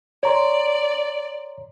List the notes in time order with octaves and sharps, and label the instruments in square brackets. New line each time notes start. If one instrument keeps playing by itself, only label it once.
[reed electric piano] C#5 A#5 C6 [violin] D5